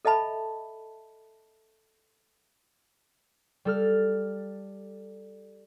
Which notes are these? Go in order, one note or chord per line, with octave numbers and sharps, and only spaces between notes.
A4 D#5 E5 A5 B5
G3 A4 F6